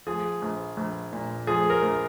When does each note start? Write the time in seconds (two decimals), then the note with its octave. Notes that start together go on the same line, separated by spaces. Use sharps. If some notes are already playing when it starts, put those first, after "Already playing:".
0.07 F3 G#4
0.42 A#1
0.77 A#1
1.12 A#2
1.47 F3 G#4
1.70 A#4
1.82 A#1